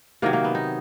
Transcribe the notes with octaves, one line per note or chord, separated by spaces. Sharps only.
C3 D#3 F#3 A#3
A#3
B3
D#4